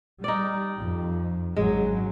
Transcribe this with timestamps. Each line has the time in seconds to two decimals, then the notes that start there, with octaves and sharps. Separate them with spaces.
0.24 G3 D#4 D5
0.79 F2
1.56 G#1 C#3 F#3 G#3